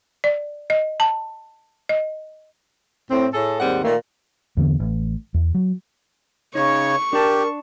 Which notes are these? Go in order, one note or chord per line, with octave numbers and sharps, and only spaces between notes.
D5
D#5
A5
D#5
A2 C4
A2 G#4 A4
D#2 G#2 G3 C4 F#5
A#2 D#3 A3 A#3
E2 D3 E3 B3
A1
E2
F#3
C#3 D#4 C#5 C#6
D4 G4 A#4 A5